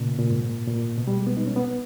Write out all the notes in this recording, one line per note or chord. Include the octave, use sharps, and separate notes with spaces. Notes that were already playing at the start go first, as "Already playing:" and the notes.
Already playing: A#2 C#3
B2
A#2
G#2
A#2
A#2
B2
G3
G#3
B3
D#4
C#4
B3